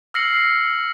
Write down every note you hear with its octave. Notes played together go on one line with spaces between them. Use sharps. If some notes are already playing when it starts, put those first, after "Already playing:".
E6 F6 A#6 C7 C#7 F#7